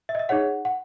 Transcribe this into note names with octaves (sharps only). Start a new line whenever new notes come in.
E5
D#5
E5
D#4 G#4 C#5 F#5
F#5